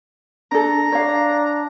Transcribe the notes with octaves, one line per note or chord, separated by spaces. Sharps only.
D4 A4 A#5
D4 C#5 F5